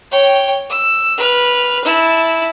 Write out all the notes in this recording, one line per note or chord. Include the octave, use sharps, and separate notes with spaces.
C#5 G5
E6
B4 F6
E4 A5